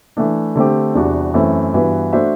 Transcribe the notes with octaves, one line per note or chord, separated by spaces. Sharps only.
E3 A3 D4
D3 A3 C4 G4
E2 C3 G3 D4 F#4
F#2 E3 A3 C4
G2 E3 B3 F#4 B4
A3 D4 F#4 C5 E5